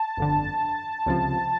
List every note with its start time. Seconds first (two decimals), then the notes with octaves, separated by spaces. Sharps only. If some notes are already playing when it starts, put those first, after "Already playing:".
Already playing: A5
0.17 G1 F2 D3
1.06 C#2 C3 F3